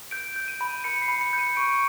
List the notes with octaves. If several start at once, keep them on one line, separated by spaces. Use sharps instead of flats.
G6 D7
G6
D#7
B5
B5 C#7
C7
B5
C#7
G6
D#7
C#6 D7